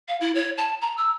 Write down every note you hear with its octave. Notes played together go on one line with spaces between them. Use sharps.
F5
E4
C#5
A5
A#5
E6